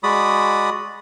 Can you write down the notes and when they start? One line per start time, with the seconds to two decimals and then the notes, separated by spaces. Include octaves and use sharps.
0.03 G#3 F#4 D5 B5 D#6